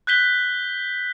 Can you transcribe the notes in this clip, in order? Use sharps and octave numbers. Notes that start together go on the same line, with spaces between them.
F#6 G6 B6 G7